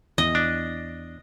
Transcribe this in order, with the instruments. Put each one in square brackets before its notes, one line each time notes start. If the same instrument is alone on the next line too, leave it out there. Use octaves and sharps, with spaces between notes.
[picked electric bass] E2 [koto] D#5
[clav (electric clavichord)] D4